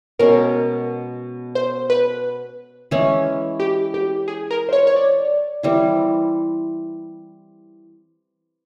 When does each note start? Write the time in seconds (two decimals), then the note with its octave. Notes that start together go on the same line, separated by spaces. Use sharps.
0.19 B2 G#3 C#4 A#4
1.55 C5
1.90 B4
2.91 E3 G#3 C#4 E4
3.60 G4
3.94 G4
4.28 G#4
4.51 A#4
4.69 C5
4.73 C#5
4.87 C#5
4.96 D5
5.63 E3 G3 C4 E4